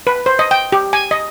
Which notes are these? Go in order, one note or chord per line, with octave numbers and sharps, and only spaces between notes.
B4
C5
D#5
G5
G4
G#5
D#5